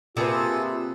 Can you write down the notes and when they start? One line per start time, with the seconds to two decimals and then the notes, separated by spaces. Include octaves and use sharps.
0.17 C3 A#3 F4 G#4 A4 B4